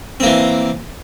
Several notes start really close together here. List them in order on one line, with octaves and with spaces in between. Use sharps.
C4 A#3 E3